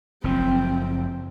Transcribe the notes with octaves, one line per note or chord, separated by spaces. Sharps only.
F#1 F3 C4